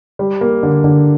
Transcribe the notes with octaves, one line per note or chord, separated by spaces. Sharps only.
G3
A#3
D3
D3